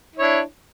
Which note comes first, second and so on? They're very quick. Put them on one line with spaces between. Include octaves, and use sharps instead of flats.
E4 C#5 D4